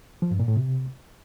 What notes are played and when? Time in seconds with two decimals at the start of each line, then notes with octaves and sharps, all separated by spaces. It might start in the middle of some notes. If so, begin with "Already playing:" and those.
0.22 F3
0.31 G2
0.39 A#2
0.48 A2
0.57 C3